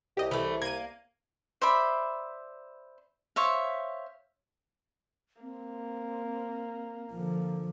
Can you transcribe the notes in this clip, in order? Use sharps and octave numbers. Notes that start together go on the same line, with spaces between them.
C2 G4 D#5
E3 A3
A#3 G#6 D#7
C5 D5 E5 B5
C5 C#5 E5 F5
A#3 C4
D3 F3